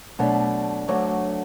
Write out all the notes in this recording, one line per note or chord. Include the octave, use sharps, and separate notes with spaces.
B2 F#3 A3 D4
D2 D3 F#3 A3